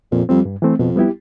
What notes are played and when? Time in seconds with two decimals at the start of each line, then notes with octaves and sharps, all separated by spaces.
0.12 F2 A#2
0.29 F2 G3 C4
0.45 G2
0.62 E3 A3 C4
0.79 F2 B2
0.96 G3 B3 E4 G4